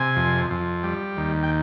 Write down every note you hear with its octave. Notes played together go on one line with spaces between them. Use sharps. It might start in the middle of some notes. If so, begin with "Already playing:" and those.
Already playing: C3 G#5
F2
F2
G3
D#2
G5